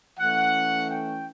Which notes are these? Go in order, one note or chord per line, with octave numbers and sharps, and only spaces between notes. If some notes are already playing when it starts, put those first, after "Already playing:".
E3 A3 C#4 F#5
G5